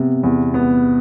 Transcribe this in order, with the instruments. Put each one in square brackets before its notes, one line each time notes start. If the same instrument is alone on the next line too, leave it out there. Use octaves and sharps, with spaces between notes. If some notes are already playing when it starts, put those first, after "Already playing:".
Already playing: [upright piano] C3 B3
E2
B3